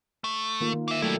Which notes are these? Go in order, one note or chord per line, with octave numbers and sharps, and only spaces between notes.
A3
D#3 A#3 F4
D#3
A#3 E5
F#3 G3 A3 E4 A4